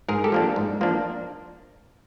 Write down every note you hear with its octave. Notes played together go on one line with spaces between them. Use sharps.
G#2 G#4 A#4
G4 A4
F3 A#3 D4
G#2
F3 A#3 D4